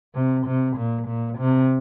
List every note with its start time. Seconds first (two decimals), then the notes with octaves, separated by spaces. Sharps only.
0.15 C3
0.46 C3
0.76 A#2
1.08 A#2
1.39 C3